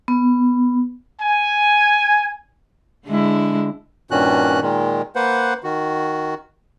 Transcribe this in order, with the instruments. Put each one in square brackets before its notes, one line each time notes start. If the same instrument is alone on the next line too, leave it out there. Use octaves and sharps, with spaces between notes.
[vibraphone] B3
[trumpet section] G#5
[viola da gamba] D3 G#3 E4
[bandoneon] G2 A#2 D#3 C#4 F#4 F#6
A#2 D#3 G#3
A#3 B4 C5 F#5
D#3 F#4